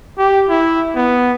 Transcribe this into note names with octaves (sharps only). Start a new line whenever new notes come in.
G4
E4
B3